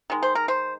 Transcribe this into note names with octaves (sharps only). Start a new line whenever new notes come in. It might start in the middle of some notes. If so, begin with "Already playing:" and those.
D#3 G#3
C5
A#4
C5